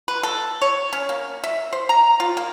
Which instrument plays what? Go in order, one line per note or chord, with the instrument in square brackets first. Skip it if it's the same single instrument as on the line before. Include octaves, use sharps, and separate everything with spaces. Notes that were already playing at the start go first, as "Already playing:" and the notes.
[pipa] B4
A4
C#5
C#4
A#3
E5
C5
A#5
F4
A#3